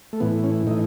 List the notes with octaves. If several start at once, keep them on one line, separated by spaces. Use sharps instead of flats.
A3
A2 E3 B3
C#4
A2 E3 D#4